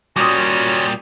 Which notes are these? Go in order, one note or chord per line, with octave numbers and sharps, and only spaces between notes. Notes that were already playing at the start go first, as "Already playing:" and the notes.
A#2 G3 C#4 F4 F#4 C#5 D6 D#6